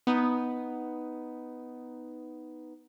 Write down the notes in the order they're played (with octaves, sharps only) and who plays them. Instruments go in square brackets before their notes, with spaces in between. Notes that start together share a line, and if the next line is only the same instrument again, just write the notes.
[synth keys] B3 D#4